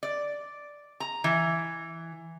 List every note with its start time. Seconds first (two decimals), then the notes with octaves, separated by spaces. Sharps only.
0.03 D5
1.00 A#5
1.24 E3